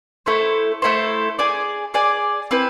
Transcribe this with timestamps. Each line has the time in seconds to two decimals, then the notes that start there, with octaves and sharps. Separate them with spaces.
0.26 A3 E4 A4 C5
0.82 A3 E4 A4 C5
1.39 G#4 D5 G#5
1.94 G#4 D5 G#5
2.51 C4 E4 B4